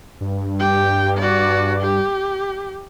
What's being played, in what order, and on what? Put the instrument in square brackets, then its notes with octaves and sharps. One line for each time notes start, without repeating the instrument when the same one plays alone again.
[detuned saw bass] G2
[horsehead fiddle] G4 G5
F#4 D5
G4